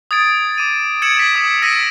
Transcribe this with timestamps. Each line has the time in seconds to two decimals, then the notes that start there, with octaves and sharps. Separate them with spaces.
0.11 D#6 G#6 A6 D7
0.58 D6 D#7
1.02 E6 G#6 C#7 D7 E7 F#7
1.17 G#6 B6 F#7
1.35 D#6
1.62 E6 A#6 B6 D7 D#7